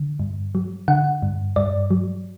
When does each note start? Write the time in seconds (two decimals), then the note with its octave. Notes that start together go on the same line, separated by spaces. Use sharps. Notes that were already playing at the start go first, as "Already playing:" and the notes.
Already playing: D3
0.20 G2
0.55 F#3
0.88 D3 F#5
1.22 G2
1.56 G2 D5
1.91 F#3